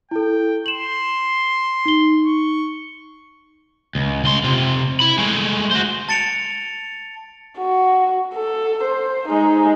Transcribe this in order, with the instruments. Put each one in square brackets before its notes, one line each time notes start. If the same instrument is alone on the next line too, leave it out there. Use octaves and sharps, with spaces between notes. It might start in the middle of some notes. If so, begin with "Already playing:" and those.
[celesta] E4 A4 [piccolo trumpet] G5
[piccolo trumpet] C6 [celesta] E7 F#7
[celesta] D#4 G7
[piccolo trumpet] C#6
[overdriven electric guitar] C#2
C#2 C6
C3 F4
E4 B5
G#3 A3
F#4 C5
[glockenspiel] A5 A6 C#7 D7 F7
[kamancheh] F#4
A4
C5
G#3 D#4